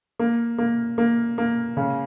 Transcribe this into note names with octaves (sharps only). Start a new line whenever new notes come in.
A#3
A#3
A#3
A#3
C#3